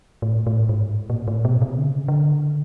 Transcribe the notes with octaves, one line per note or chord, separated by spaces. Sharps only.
A2
A2
G#2
A#2
A2
B2
C3
D3
C#3
D3